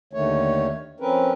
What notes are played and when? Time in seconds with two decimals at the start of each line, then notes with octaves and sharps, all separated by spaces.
0.13 D#2 D3 D#3 A3 C#5
1.00 F3 C4 C#4 A#4 B4